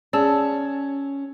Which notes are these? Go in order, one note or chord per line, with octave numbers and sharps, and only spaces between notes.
C#4 G#4 D5 A5 E6